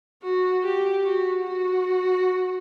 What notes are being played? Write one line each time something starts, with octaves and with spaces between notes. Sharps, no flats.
F#4
G4
F#4
F#4